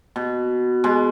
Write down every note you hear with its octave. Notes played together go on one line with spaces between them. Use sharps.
B2
B2 G#3